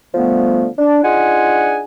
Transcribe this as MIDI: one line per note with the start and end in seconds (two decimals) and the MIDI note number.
0.14 0.67 50
0.14 0.67 53
0.14 0.67 55
0.14 0.67 57
0.14 0.67 59
0.78 1.01 62
1.03 1.82 62
1.03 1.82 63
1.03 1.82 65
1.03 1.82 68
1.03 1.82 78
1.03 1.82 80